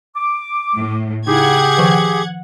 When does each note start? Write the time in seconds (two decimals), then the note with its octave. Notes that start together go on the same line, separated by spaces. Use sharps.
0.16 D6
0.76 A2
1.27 C#3 D#4 E4 G4 G#4 F#5 G5 G#6
1.77 D#3 F3 B4